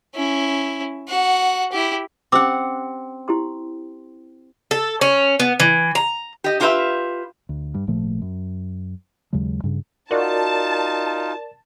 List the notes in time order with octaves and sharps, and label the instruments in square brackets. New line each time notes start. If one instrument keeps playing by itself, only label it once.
[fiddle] C#4 E4
F#4 F#5
E4 G4
[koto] C4 F#5 [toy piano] C#4 G4 D6
[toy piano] E4 G4 C6
[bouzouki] A4
C#4
B3
E3
A#5
[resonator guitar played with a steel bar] G4 D#5
D4 F4 G4 A4 B4 E5
[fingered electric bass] D2
G2
G#1 A#2 F3 A3
F#2
D#2 C#3 F#3 G#3
G2 C#3
[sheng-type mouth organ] D#4 F4 [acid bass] F#4 [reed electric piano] A#4 D5 [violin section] A5